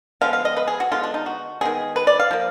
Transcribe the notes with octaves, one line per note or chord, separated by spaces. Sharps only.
D3 F3 G#3 B3 F5
F5
D#5
B4
G#4
F#4
D3 G#3 B3 F4
D4
D#4
F#4
D#3 G#3 B3 G#4
B4
D5
F5
F3 A#3